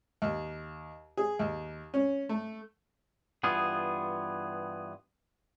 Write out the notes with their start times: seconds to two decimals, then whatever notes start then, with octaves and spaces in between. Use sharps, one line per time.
0.22 D#2
1.17 G#4
1.39 D#2
1.94 C#4
2.29 A3
3.43 G2 E3 B3 F4 G#4